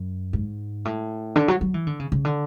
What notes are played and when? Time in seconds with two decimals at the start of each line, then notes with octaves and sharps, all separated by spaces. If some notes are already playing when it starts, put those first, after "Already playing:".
Already playing: F#2
0.33 G#2
0.85 A2
1.36 D3
1.48 F#3
1.61 F#3
1.74 E3
1.87 D3
1.99 C#3
2.12 C#3
2.25 D3